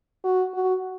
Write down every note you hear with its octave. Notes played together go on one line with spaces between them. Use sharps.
F#4
F#4